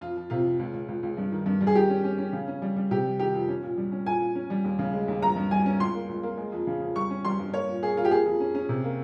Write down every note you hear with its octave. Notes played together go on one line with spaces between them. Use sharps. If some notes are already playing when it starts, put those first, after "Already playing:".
F2 F4
F3
C3 F4
F2
C#2
C#2
C#2
C#2
G2
D#3
G2
G3
G#4
D#3 G4
C#4
C#4
C#4
C#3
C#4
G3
G3
C3 G4
G3
D#3 G4
F2
C#4
A#2
G3
C#4
A#2 G#5
A#2
C#4
G3
D#2
C#3
G#3
D#2
G2 A#5
G2
G3 G#5
C#4
C#2 C6
A#3
C#2
A#3
G#3
F2
C#3
F2
G3 C#6
C#4
G3 C6
G2
A#3 C#5
A#2
A#3 G#4
A#3 F4
G4
A#3 G#4
F2
C#4
C#4
C3
A#3